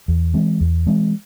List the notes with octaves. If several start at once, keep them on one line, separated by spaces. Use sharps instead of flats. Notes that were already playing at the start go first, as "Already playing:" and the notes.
E2
E3 G#3 C4
E2
E3 G#3 C4